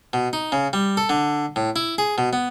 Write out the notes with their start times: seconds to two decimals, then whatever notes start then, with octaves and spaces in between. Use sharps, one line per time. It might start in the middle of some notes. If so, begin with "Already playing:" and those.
0.13 B2
0.33 D#4
0.52 C#3
0.73 G3
0.97 A4
1.09 D3
1.56 A2
1.76 E4
1.98 G#4
2.18 B2
2.33 B3